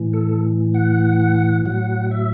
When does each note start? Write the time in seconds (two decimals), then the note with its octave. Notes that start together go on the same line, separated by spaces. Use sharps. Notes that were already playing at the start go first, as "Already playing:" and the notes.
Already playing: A2 E3
0.13 A4
0.74 F#5
1.66 A2 F#3 F#5
2.11 E5